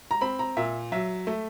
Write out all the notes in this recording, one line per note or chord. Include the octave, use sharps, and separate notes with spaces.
A#5
C4 B5
A#5
A#2 E5
F#3 E5
A3